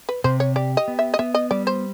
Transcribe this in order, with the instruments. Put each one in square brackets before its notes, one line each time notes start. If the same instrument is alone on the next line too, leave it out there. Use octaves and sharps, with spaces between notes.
[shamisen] B4
[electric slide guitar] C3 [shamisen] C5
[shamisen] C#5
[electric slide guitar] G4 [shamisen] D5
[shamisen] D#5
[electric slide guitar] B3
[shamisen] E5
D#5
[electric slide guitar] B3 [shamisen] E5
[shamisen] D#5
[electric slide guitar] G3 [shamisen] D5
[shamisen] C5